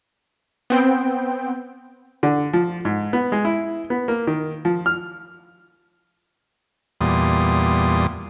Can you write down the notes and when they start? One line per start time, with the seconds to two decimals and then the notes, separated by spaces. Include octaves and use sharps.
0.70 B3 C4 G5
2.23 D3
2.53 F3
2.85 G#2
3.13 B3
3.32 G#3
3.45 E4
3.90 B3
4.08 A#3
4.27 D#3
4.65 F3
4.86 F6
7.01 E2 A#2 G3 C6 D#6